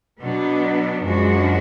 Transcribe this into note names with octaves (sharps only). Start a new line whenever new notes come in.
B2 F#3 B3 D4
F#2 F3 G#3 D4 F#4